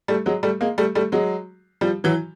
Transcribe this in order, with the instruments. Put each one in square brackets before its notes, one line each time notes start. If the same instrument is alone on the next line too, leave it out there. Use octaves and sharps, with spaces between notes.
[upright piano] G3 A3
F#3 G#3
G3 A3
G#3 A#3
G3 A3
G3 A3
F#3 G#3
F3 G3
E3 F#3